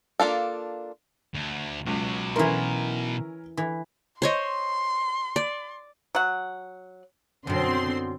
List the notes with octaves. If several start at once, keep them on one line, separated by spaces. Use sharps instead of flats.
A#3 D4 F4 A4
D2
C#2 B2 F#3
E3 C#4 E4 A#4 C6
E3
C5 C#5 D#5 C6
D5
F#3 F#5
F#2 B2 D3 C4 C6